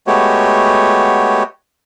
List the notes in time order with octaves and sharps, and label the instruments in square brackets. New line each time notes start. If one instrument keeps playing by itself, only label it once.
[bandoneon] G#3 A3 B3 F#4 G4 C#5